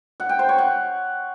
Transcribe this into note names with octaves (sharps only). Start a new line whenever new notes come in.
F#5
G5
C5
C#5
F#5